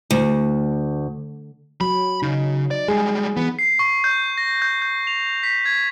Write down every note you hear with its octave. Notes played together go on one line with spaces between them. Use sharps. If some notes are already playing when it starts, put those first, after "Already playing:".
D2
F#3 B5
C#3 D#4
D5
G3 G#3 G#4
E3 B3
C7
C#6
G6
A#6
G6
G6
F7
B6
G#6